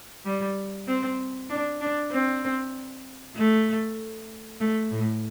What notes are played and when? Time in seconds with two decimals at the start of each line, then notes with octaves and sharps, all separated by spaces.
0.25 G3
0.87 C4
1.50 D4
1.81 D4
2.12 C4
3.36 A3
4.60 A3
4.92 A2